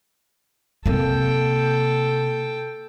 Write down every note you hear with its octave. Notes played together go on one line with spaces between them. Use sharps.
C3 A#3 A4 G5